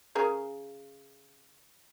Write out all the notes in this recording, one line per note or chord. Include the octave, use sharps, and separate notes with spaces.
C#3 G#4 A#4